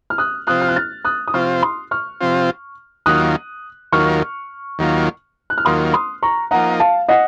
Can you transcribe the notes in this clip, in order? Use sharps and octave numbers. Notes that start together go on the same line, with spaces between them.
F6
D#6 F#6
C3 F3 C4 F4 D#6 F#6
F6
F#6
F6 A6
D#6 F#6
D#6
C3 F3 C4 F4 C#6 F6
C6 D#6
C#6 F6
C3 F3 C4 F4
D#2 D#3 F#3 A#3 F4 D#6 F#6
D#2 D#3 F#3 A#3 F4 C#6 F6
D#2 D#3 F#3 A#3 F4
F#6
F6
D#2 D#3 F#3 A#3 F4 C6 D#6
C6 D#6
A#5 C#6
F3 A#3 D#4 F#5 A#5
F5 A5
D#5 F#5